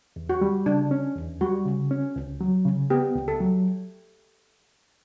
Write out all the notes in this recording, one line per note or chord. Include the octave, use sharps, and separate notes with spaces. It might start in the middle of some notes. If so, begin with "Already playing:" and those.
E2
F#4
G3
C#3 D4
C#4
E2
G3 F#4
C#3
C#4
C#2
F#3
C#3
B3 G4
C#2
A4
F#3